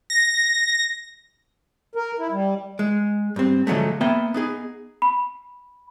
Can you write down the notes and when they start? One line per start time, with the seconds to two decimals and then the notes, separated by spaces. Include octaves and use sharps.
0.10 A#6
1.95 A#4
2.19 E4
2.32 G3
2.79 G#3
3.36 G2 C4
3.67 D3 F3 F#3 G#3 A3
4.01 A#3 B3 E5 G5
4.34 B3 D#4 G#4
5.02 B5